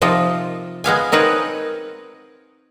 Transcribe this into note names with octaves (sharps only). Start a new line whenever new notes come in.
C3 F3 D#4 F4
G#3 B3 F5 G#5
C4 D#4 A#4 B4 C#5